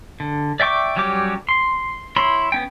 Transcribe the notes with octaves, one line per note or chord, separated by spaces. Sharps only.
D3
D5 E5 G5 C#6 D6
F#3 G3 C#4 G4 D6
C6
E4 C#5 B5 C6
B3 C#4 G5